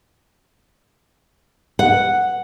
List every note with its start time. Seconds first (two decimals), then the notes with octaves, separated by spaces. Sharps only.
1.79 F#5